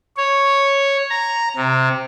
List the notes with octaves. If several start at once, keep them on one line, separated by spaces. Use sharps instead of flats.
C#5
A#5
C3